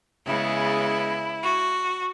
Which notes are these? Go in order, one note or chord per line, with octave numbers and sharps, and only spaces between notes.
C#3 G#3 B3 E4
F#4